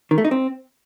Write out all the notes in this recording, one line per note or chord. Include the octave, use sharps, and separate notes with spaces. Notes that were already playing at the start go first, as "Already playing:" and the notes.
D#3
A3
D#4
C4